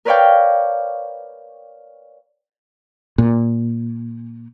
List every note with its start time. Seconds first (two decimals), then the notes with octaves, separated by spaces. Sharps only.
0.05 A#4 B4 C#5 D5 F5 G5
3.18 A#2